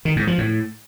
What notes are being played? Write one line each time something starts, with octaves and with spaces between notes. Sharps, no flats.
D#3
G#2
F3
A2